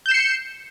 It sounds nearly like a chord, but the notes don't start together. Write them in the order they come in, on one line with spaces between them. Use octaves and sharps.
G6 E7 C7 C#7